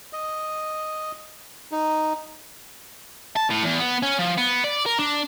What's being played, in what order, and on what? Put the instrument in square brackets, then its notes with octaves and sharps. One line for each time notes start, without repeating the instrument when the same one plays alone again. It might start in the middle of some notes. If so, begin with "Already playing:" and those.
[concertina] D#5
D#4
[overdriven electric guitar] A5
A2
E2
B3
C#4
F3
B3
D5
A#4
D4